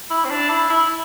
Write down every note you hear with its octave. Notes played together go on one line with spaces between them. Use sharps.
E4
C4
D4
E4
E4